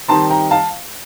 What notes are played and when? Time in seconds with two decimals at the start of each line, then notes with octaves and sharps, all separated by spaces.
0.08 D#3 G3 C4 D#4 A5 C6
0.30 G5 A#5
0.51 F5 A5